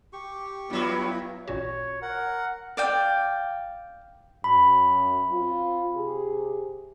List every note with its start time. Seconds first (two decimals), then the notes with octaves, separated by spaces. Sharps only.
0.13 G4 C#6
0.70 G2 F#3 B3 E4 F4
1.48 A1 A#2 F#4 C#5
2.02 A#4 F#5
2.77 D5 F5 G5
4.44 F#2 B5
5.31 C4 F4
5.95 C3 G4 G#4